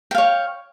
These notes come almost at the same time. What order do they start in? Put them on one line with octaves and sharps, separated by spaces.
G5 F5 C#5